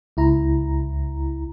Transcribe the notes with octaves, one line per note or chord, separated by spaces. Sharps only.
C#2 E4 A#5